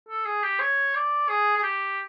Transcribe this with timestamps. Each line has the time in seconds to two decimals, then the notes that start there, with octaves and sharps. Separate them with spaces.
0.09 A4
0.26 G#4
0.43 G4
0.60 C#5
0.95 D5
1.29 G#4
1.57 G#4
1.63 G4